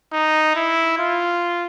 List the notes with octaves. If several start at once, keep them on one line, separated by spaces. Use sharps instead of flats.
D#4
E4
F4